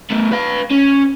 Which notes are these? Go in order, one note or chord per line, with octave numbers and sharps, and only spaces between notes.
A3 B3
B4 F5
C#4